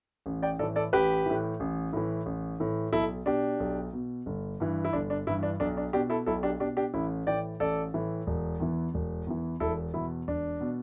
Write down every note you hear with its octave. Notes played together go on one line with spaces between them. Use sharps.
A1
D5 G5
A2 E3 A4 D5
A4 D5
A1 G4 B4
A2 E3
A1
A2 E3
A1
A2 E3
B1 E4 A4
B2 D4 G4
B1
B2
G1
G2 E3
E4
G1 D4
D4
G2 E3 E4
D4
B1 D4
D4
B2 D4 G4
E4 A4
B1 E4 A4
D4 G4
B2 D4 G4
D4 G4
A1 E4
A2 E3 D5 G5
A1 A4 D5
A2 E3
E1
E2 E3
E1
E2 E3
E1 E4 A4
E2 B2 E4
E1 D4
B2